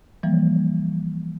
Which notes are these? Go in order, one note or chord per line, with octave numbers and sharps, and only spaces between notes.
E3 F3 G3 A#3